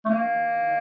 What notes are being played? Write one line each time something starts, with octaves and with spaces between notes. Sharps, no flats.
A3
A#3